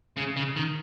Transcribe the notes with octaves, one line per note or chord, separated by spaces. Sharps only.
C#3
C#3
D#3